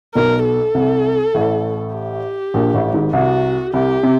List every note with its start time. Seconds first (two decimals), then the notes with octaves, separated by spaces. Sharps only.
0.15 B1 B2 A#4
0.45 A4
0.74 C2 C3
1.34 A1 A2
1.94 G4
2.54 A#1 A#2
2.74 A1 A2
2.93 G#1 G#2
3.13 C2 C3 F#4
3.73 C2 C3 G4
4.03 C3